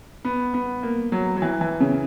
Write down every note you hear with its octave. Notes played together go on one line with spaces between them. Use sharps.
B3
B3
A#3
F#3
F#3
E3
E3
C#3